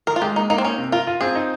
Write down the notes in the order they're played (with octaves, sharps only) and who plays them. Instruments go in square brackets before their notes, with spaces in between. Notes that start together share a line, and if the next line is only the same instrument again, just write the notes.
[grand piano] D#3 [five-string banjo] A#4
[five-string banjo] F4
[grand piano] G#3 [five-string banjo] G4
[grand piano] A#3 [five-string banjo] D#4
[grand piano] A#3 [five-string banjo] D#4
[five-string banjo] C4
[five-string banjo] C#4 [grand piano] D#4
[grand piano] C3
[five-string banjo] F4 [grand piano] A#4
[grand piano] F4
[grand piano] C4 [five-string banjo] G#4
[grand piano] D#4